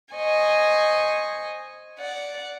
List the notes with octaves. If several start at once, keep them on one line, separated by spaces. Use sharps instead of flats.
C5 D#5 G#5 C#6
D5 F#5